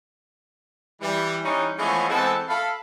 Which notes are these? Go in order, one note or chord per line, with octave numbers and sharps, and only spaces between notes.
E3 G3
E3 G3 C#4 D#4
E3 F3 G#3 A3 B3 C#4
E3 G#3 B3 C4 A4 A5
A4 F5 B5